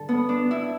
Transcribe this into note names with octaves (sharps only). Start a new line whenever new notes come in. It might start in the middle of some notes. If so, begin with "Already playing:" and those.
Already playing: G2 D3 G3 A4
B3
D4
E4